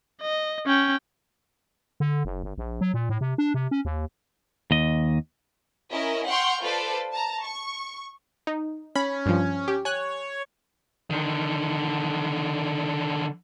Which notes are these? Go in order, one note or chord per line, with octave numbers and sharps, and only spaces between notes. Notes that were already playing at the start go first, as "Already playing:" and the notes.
D#5
C#4 G5
D3
F#1
G1
A#1
F#3
A#2
A2
C3
D4
C3
C#4
D#2
D#2 D#5
C#4 E4 A#4 D#5
F#5 G5 C6 C#6 F6 G6
F4 A4 B4 C5 D5
A5 A#5
C#6
D#4
C#4 B5
G2 F3
G4
C#5 G#5 F#6
D3 D#3